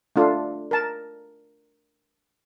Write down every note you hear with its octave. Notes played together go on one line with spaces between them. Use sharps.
A3 D4 F4 A4
A#4 A5